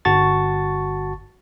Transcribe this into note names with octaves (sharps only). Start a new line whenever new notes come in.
G1 F#4 A5 C#6 A6